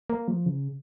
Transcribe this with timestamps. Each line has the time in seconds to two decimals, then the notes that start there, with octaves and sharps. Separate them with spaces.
0.10 A#3
0.28 F3
0.46 C#3